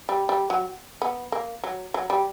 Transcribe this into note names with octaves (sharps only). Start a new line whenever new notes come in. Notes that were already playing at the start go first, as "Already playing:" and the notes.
G3
G3
F#3
B3
A#3
F#3
F#3
G3